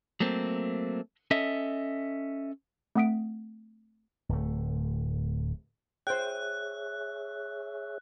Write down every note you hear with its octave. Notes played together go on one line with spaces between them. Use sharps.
F#3 A3 A#3 C4
C#4 A4 D#5 E5
A3 C4 F#5 D#6 B6 D7
D1 A3
G#4 C5 C#5 E5 G5 F#6